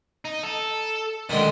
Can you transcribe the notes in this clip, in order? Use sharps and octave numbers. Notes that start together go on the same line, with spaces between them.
D#4
A4
F#2 A#2 D3 D#3 G#3